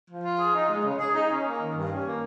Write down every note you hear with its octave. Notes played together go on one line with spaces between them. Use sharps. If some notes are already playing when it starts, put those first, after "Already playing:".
F3
F4
G#4
D#4
G#3
C#3
G#4
D#4
C#4
A#3
D#3
G2
C#4
A#3